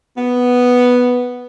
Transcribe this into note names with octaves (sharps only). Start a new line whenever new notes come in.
B3